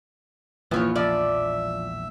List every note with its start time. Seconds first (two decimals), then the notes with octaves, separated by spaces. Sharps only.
0.71 E1 A#1 E3 F3 A#3 F4 B4 C#5
0.96 F3 D5 E5